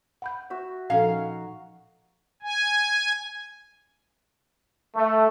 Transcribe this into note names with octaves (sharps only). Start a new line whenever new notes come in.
F#5 B5 G6
F#4 E5
A#2 F3 C#4 D#4 A4 F5
G#5
A3